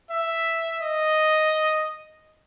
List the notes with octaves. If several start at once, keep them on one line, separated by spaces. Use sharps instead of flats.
E5
D#5